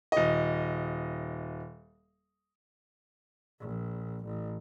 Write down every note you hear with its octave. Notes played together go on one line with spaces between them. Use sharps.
D#1 D#5
A#1
A1